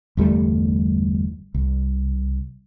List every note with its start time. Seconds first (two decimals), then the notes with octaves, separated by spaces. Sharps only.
0.17 G1 E2 G3 A3
1.54 C2